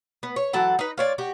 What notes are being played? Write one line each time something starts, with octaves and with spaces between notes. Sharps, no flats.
B3
C#5
E3 F#3 A4 F#5
D#4 B4
F4 C#5 D5
F#4 G4